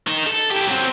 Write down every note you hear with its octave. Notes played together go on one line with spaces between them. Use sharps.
D#3 D#4
A4
E4 G4
F#3 C4